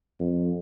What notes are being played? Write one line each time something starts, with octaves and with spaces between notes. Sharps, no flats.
F2